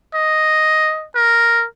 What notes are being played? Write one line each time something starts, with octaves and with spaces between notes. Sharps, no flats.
D#5
A#4